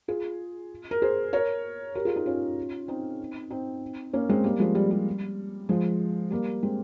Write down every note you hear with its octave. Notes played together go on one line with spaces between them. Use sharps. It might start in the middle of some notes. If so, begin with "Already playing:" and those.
F4 G#4
A#4
G#4 C5
A#4 C#5
G4 A#4
F4 G#4
D#4 G4
C#4 F4
C4 D#4
C4 D#4
A#3 C#4
G#3 C4
G3 A#3
F3 G#3
G3
G3
F3 G#3
G3 A#3
G#3 C4